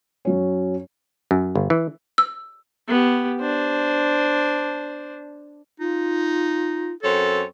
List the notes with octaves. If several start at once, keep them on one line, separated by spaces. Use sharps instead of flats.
F#2 F#3 C#4
F#2
G1
E3
E6
B3 G4
D4 C5
D#4 F4
F#2 C4 A4 C#5